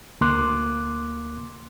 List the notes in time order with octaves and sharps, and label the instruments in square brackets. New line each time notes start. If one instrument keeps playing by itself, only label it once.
[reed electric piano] D2 A#3 C6 D6 F#6